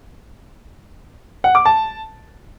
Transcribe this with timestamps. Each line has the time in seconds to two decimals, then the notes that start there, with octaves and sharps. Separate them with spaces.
1.44 F#5
1.55 D6
1.65 A5